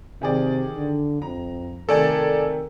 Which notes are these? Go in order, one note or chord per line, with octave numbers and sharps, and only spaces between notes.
C3 D#3 G#4 D5
D3
F2 A#5
C3 D#3 A3 A4 A#4 D5 G#5